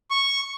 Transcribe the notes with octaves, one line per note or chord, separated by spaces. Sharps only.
C#6